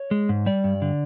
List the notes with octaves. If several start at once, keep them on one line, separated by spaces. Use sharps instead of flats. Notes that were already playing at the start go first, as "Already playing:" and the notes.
Already playing: C#5
G#3
G#2
G3 D5
G2
D3